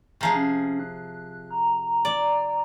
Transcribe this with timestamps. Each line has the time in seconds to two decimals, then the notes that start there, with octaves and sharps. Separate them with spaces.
0.21 C3 F3 G#4 A#5
0.35 C#4
0.80 F#6
1.51 A#5
2.05 D5